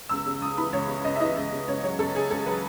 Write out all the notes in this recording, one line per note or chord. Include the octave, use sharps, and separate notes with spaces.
C#2 E6
C#3
C#2 D#6
E3 B5
C#2 C#5
C#3
C#2 D#5
E5
E3 D#5
C#2
C#3
C#2 C#5
F#3 C#5
C#2 A4
C#3 G#4
C#2 A4
F#3 B4